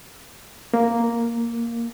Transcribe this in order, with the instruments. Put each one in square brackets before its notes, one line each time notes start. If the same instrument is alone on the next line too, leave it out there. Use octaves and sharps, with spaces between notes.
[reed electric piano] A#3